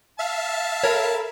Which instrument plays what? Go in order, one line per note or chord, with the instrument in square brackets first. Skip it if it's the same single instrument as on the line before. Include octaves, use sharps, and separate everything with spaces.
[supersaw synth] E5 F5 [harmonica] A5
[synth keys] A4 A#4 B5 [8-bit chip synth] C#5